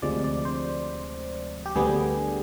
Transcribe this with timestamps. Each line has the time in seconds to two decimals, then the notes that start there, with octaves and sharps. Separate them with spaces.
0.02 D2 C3 F3 G#3 D5
0.24 D5
0.45 C5
1.66 G4
1.76 D2 D3 G3 B3 G#4